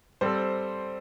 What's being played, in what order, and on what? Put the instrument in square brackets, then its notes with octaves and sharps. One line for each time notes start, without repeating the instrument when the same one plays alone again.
[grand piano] G3 C4 A4 [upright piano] C5